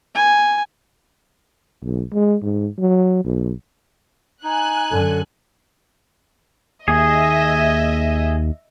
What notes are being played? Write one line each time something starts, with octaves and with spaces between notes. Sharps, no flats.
G#5
B1
G#3
G#2
F#3
B1
D#4 G#5 F#6
F#2 D3 A4
D#2 G#4 D#5 E5